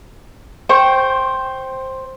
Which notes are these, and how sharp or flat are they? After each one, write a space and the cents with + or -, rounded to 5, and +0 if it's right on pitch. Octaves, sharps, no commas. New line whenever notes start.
C5 +10 G5 -5 C#6 -10